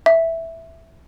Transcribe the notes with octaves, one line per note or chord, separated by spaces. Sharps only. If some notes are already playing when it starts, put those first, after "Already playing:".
E5